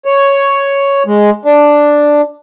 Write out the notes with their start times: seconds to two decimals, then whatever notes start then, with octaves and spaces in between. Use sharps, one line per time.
0.05 C#5
1.07 G#3
1.45 D4